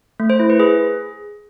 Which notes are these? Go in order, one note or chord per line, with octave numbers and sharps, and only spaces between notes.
A3
C5
E4
B4
G#4